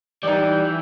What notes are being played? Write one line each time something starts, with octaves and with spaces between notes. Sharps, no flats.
E3 G3 D#4 D5 G6